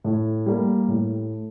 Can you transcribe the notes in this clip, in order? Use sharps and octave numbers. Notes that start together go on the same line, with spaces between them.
A2
G3 A#3
A2